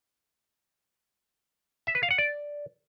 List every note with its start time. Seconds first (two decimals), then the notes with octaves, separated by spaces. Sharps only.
1.87 E5
1.95 B4
2.03 F5
2.11 F#5
2.18 D5